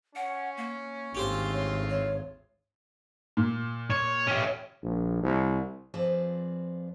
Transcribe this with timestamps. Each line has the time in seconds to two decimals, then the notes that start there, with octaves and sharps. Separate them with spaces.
0.15 C#4 F#5
0.57 A#3
1.15 G#1 D2 A3 C4 C#4 F4 G4 C5
1.52 C#5
1.90 C#5
3.37 A#2
3.90 C#5
4.27 C#4 G4
4.82 A#1
5.23 C2
5.94 F2 F3 C4 G#4 B4 D5